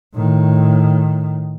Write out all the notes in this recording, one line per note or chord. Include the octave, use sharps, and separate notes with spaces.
A2 D#3